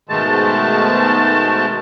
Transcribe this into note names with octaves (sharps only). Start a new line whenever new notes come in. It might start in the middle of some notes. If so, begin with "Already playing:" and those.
G#2 B2 D#3 G#3 A3 A5